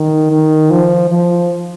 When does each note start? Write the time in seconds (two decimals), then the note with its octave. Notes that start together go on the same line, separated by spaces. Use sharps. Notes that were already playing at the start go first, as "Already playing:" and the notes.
Already playing: D#3
0.31 D#3
0.71 F3
1.09 F3